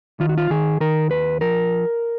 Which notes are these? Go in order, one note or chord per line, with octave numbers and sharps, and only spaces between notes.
D#3 F4
F#4
F4
D#3 G#4
D#3 A#4
D#2 B4
F3 A#4